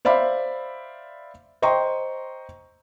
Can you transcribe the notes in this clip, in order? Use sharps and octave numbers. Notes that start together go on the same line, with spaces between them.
C5 D5 E5 F5 B5
C5 D#5 G5 A#5 C6 C#6